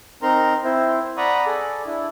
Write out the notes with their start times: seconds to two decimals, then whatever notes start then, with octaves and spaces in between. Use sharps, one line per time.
0.22 C4 D#4 A#4 A#5 C6
0.64 C4 E4 C5
1.17 D5 F#5 A#5 B5 C#6 D#6
1.46 G#4 A4 D5
1.86 D4 E4